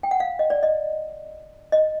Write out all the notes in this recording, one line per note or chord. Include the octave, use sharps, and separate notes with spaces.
G5
F#5
F5
D#5
D5
D#5
D#5